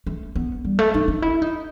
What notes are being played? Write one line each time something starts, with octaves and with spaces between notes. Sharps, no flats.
A3
B3
G3
A3
D#4
D#4
E4
D#4